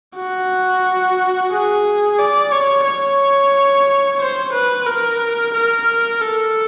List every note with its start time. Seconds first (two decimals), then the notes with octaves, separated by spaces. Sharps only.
0.16 F#4
1.51 G#4
2.19 D5
2.52 C#5
2.85 C#5
4.20 C5
4.53 B4
4.87 A#4
5.54 A#4
6.21 A4